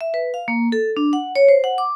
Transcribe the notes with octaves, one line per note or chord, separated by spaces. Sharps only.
E5
B4
F5
A#3
A4
D4
F#5
C#5
C5
F#5
D6